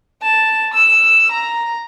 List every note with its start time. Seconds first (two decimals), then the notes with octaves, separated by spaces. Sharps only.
0.22 A5
0.74 E6
1.32 A#5